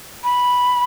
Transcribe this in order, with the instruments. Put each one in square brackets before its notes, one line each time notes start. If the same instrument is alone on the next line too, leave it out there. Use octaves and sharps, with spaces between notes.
[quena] B5